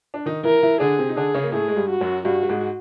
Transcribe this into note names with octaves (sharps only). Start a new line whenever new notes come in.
D4
D#3 D#4
E3 E4 A#4
E3 E4
D3 D4 G#4
C3 C4
D#4
D3 D4 G#4
C#3 C#4
A#3
A2 A3 G#4
G#3
G2 G3
F#4
F#2 F#3
G2 G3 F#4
G3
G#2 G#3